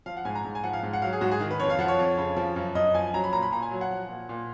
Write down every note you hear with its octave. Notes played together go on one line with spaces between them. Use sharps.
F3 F5
F#5
G#2 G#5
A#5
G#2
G#5
F3 F#5
F5
G#2
F#5
F#3 F5
G#4
G#2 F#4
G#4
D#3
B4
F2 C#5
F5
F3 F#5
C#5
F2
C#3
F3
F#2
F#2 D#5
F3 G#5
F#3 A#5
B5
A#2 A#5
B5
A#2 A#5
G#5
F#3
F#5
F3
A#2
A#2